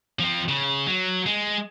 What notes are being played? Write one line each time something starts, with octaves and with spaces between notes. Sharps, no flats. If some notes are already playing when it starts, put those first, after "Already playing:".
F3 C4
C#3
F#3
G#3